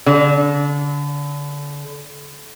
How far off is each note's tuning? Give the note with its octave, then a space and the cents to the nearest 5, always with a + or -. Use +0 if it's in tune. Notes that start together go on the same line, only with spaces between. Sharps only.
D3 -30